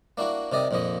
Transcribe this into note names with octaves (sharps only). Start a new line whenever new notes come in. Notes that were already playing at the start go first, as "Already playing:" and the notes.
A#3 D4 E4 F#4
C3 D#3 D5 D#5
A#1 F2 A#2 F3 D#5